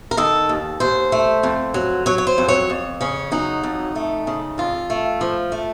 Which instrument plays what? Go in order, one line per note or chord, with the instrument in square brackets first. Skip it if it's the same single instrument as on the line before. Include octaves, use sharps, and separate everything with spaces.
[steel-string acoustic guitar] A#4
D#3 A4
D#2
D#2 C5
A3
F2
F#3
F#3 C#5
C#5
C5
F2
C#5
F2
C#3 C#4
F#3 D#4
F2
A3
C#3
F2 F4
A3
F3
A3